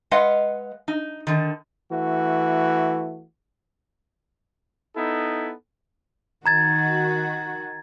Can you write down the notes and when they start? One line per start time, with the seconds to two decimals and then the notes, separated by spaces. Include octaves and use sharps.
0.11 G#3 B4 D#5 F5 F#5
0.88 D#4
1.27 D3 D#3
1.92 E3 A3 F#4
4.96 B3 D#4 E4 A4
6.46 D#3 F#4 A#5 G#6 A6